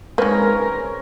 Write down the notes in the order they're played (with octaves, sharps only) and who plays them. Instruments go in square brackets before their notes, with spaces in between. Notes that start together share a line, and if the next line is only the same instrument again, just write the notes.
[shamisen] D#3 A#3 [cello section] G#3 A#4 [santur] C4 C#4 [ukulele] B4